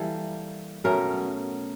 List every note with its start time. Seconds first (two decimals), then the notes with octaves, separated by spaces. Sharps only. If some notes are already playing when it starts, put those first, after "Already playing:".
Already playing: E3 G3 A#3 A4
0.84 B2 F#3 A3 C#4 A#4